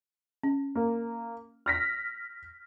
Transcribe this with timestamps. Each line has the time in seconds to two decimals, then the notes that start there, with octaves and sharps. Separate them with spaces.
0.44 C#4
0.75 A#3
1.66 F6 A#6 B6